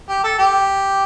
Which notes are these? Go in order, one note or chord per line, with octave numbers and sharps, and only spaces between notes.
G4
A4
G4